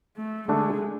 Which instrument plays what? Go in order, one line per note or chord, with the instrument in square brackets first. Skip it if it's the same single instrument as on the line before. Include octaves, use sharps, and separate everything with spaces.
[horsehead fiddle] A3
[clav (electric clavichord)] D3 A3 D4 A4 [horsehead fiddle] G#3